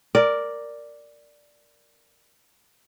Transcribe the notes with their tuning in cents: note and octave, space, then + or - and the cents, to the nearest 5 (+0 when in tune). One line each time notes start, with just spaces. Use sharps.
A#4 -5 D5 +0